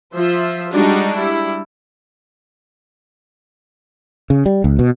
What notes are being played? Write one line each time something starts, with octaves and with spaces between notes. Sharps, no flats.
F3 F4 C5 E5
G3 G#3 D4 D#4 F#4
G3 E4
C#3
G3
C#2
B2